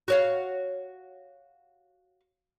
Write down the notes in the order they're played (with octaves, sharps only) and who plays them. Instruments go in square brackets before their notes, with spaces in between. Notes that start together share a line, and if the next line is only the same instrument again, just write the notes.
[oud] F#4 C#5 F5